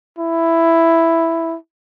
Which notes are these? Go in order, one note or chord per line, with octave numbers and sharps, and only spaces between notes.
E4